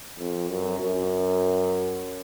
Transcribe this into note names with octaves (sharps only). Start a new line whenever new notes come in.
F2
F#2
F#2